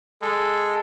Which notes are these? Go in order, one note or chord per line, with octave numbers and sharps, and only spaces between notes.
G#3 A4